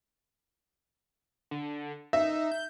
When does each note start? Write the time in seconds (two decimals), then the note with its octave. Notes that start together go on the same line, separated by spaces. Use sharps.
1.51 D3
2.13 D#4 E5
2.52 G6